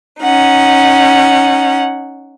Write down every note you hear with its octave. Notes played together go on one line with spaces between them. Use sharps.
C#4 D#4 F#5